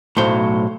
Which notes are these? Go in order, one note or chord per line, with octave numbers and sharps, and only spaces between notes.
B1 A2 F#3 C5